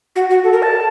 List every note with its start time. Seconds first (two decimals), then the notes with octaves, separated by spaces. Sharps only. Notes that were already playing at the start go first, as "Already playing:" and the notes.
0.16 F#4
0.30 F#4
0.44 A4
0.53 A#4
0.62 A5